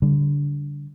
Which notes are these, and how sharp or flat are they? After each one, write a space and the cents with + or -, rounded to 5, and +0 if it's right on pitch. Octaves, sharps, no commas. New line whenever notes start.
D3 -25 G3 +5